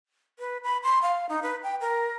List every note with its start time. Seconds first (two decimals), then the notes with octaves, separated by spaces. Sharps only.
0.39 B4
0.64 B5
0.83 C6
1.02 F5
1.29 D#4
1.43 B4
1.63 G5
1.81 A#4